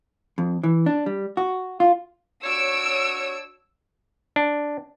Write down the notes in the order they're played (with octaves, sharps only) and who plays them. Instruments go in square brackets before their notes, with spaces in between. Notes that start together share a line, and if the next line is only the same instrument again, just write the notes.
[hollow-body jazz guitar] F2
E3
D4
G3
F#4
F4
[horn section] D4 F#4 C#5 [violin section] E6 D7
[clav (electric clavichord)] D4